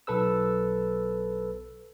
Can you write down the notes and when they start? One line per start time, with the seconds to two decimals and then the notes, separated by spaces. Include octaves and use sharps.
0.07 B1 A4 B4 E6